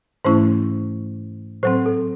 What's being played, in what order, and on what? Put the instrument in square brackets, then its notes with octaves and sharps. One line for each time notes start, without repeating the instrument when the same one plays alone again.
[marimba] G#2 E3 A3 C#4 E4 [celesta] C5
[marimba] A2 F#3 C4 [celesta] C5
[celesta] A4